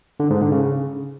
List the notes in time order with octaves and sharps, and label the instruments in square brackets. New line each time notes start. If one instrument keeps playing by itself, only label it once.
[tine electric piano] D3
G#2
D3
C#3